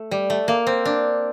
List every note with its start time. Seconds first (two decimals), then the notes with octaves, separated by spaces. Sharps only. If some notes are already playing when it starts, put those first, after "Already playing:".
Already playing: A3
0.11 G3
0.30 A3
0.48 A#3
0.67 C4
0.85 D4